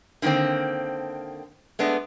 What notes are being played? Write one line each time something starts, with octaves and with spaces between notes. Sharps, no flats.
D3 D#3 F#3 A#3 C4
G#3 A3 B3 D4